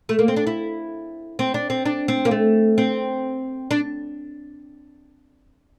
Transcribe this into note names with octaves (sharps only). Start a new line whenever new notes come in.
A3
A#3
C4
D4
E4
C4
D4
C4
D4
C4
A#3
A3
C4
D4